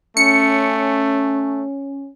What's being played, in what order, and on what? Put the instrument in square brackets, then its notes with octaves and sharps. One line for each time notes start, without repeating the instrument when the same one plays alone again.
[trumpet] A3 [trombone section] C#4 [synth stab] C#7